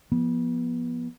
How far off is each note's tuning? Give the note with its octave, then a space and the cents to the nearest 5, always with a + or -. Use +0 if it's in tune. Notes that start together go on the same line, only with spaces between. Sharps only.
F3 -10 B3 -30